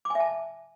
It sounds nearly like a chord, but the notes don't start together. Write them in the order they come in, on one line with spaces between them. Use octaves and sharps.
D6 G#5 E5 A5